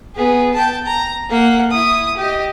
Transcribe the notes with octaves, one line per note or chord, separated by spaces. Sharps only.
B3 G#4
G5 A5
A#5
A#3 F#5
E4 D#6
G4 D#5